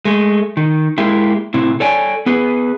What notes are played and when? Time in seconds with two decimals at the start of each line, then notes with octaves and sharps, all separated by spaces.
0.05 G#3 A3
0.57 D#3
0.98 G#3 A#3 E4 G4
1.54 A2 C3 C4 E4
1.80 A4 C#5 D5 G5 G#5
2.26 B3 G#4 B4